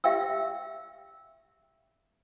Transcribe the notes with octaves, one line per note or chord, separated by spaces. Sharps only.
G4 E5 F5 G5 E6